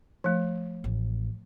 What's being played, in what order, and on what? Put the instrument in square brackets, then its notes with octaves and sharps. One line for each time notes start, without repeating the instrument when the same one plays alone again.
[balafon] F3 A3
[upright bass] A1